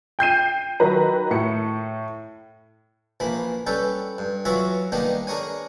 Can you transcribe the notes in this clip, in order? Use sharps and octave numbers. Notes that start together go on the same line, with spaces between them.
G5 G6 C7 D#7
D#3 F#3 B4 A#5
A2 C#7
A#1 E3 A#3 B5
G3 C#4 A4 B4 G5
G2
E3 F#3 F4 F#4 C#5 E5
D#3 G3 A#3 B3 D4 D#4
D4 G#4 A#4 C#5 G#5